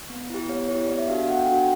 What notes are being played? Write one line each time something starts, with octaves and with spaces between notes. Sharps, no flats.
B3
E4 G4
B3 C#5
E4 G4 C#5
B3 D5
E5
D4 F#4 A4 F5
F5
B3 F#5
G5
D4 F#4 A4 F#5
G5